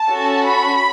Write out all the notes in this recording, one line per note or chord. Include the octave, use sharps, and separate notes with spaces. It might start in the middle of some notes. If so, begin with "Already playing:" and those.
Already playing: A5
C#4 F#4 A4
B5